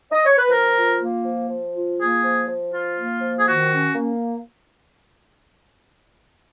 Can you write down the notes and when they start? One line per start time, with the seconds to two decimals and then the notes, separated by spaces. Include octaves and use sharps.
0.12 D#5
0.25 C#5
0.37 B4
0.50 F3 A#4
0.75 F4
1.00 A#3
1.24 F3
1.49 F3
1.73 F4
1.98 A#3 G#4
2.23 F3
2.48 F3
2.72 F4
2.98 A#3
3.21 F3
3.37 G#4
3.46 D#3 F#4
3.71 C#4
3.95 A#3